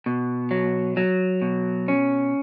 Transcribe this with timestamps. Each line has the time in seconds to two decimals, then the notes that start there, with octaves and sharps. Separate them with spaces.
0.06 B2
0.51 F#3
0.97 F#3
1.42 B2
1.88 C#4